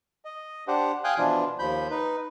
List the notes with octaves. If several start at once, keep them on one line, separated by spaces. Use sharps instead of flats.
D#5
D4 G4 C5 F#5
F5 G5 G#5 D#6 F#6 G6
B2 E3 F3 D4 F4
D#2 F3 B5 G6
D#4 B4